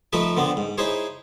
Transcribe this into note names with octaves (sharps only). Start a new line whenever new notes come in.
F3 A3 D#4 B4 E5
D3 B3 C4 D4
G#2
D#4 E4 G#4 C5 C#5